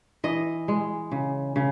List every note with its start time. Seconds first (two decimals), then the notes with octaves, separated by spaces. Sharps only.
0.24 E3 D#5
0.68 G#3
1.12 C#3
1.56 C#3